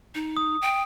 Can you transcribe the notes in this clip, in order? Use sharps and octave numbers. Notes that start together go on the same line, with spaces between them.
D#4
D#6
G5